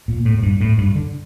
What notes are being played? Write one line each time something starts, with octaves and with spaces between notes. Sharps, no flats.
A#2
A2
A2
G2
A2
G2
D3